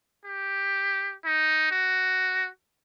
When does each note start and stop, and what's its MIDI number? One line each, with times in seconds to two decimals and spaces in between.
0.25 1.15 67
1.25 1.68 63
1.72 2.48 66